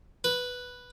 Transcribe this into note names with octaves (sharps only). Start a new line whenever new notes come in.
B4